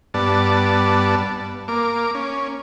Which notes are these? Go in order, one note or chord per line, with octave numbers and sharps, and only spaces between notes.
G2 B3 D5 A5
A#3 D6
C#4